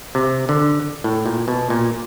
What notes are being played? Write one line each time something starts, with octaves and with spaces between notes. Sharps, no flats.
C3
D3
A2
A#2
B2
A#2